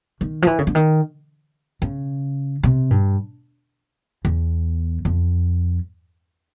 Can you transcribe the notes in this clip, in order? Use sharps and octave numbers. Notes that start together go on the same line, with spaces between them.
D#3
F3
E3
C#3
D3
D#3
C#3
C3
G2
E2
F2